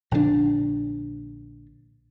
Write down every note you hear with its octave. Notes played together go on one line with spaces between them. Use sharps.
A#1 D3 D#3 D4